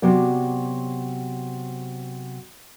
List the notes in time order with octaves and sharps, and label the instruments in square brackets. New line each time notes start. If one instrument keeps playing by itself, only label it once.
[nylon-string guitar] C3 F#3 B3 D5